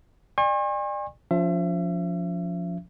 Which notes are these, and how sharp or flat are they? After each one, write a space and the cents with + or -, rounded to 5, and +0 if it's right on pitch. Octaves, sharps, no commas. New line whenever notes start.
D5 +30 G#5 -45 C#6 -45
F3 +10 C#4 +40 E5 +35